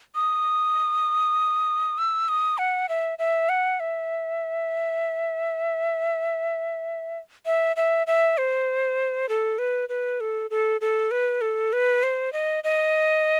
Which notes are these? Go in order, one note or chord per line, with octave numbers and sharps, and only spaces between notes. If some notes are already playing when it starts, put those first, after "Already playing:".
D#6
E6
D#6
F#5
E5
E5
F#5
E5
E5
E5
E5
C5
A4
B4
B4
A4
A4
A4
B4
A4
B4
C5
D#5
D#5